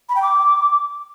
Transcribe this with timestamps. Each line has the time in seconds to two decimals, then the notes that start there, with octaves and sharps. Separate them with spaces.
0.09 B5
0.16 G5
0.22 D6